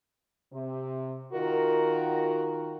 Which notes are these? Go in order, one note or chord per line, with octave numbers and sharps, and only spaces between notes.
C3
D#3 F4 F#4 A#4